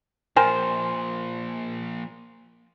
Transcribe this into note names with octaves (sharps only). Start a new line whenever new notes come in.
A#2 F3 A#4 C5 G5 G#5